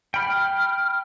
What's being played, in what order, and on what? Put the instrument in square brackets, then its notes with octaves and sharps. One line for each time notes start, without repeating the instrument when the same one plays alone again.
[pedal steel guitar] G5 B5 [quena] F6